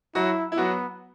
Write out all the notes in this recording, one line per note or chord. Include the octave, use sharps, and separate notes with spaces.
F#3 E4 F#4
E4
F#3 B3 F#4